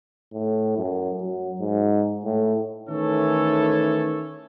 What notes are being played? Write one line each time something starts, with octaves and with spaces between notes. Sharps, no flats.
A2
F#2
F#3
G#2
A2
D#3 E3 A3 C#4 A4 C#5